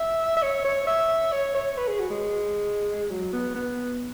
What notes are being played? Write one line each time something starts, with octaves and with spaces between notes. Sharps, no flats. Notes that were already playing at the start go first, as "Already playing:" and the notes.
Already playing: E5
E5
C#5
C#5
E5
C#5
C#5
B4
G#4
F#4
G#3
F#3
B3
B3